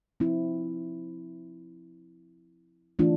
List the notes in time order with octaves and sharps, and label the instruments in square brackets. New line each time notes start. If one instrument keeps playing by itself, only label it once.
[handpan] F3 C4 E4
E3 A3 D4 F4